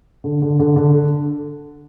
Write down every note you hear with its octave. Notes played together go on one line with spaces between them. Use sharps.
D3
D3
D3
D3